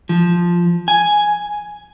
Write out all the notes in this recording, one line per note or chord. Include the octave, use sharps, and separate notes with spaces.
F3
G#5